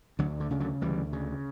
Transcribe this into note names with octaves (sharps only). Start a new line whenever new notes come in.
D2 D3 F#3
D3
C#3
D3 F#3
D2 E3 G3
C#3